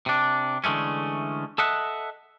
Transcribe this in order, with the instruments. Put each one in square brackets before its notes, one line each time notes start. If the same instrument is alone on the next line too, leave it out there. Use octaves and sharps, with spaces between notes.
[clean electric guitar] C3 D4
D3 E3 G#3 A3 C#4
A4 D#5 E5 F#5